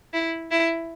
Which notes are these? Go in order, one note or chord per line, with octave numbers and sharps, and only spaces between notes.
E4
E4